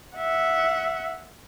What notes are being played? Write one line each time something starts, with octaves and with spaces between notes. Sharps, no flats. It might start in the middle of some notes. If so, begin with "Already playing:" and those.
E5 F#5